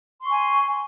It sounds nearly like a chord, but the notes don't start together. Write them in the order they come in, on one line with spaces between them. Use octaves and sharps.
C6 C#6 G#5